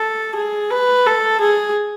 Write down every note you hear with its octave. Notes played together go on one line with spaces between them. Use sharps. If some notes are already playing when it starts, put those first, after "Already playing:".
Already playing: A4
G#4
B4
A4
G#4